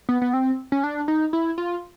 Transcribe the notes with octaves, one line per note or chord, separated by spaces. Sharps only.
B3
B3
C4
C#4
D4
D#4
E4
F4